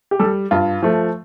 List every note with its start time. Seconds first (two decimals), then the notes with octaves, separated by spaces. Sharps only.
0.11 G4
0.19 G3 A4
0.51 G2 F4
0.83 F3 A3